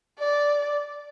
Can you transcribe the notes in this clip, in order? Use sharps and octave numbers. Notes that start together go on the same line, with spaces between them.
D5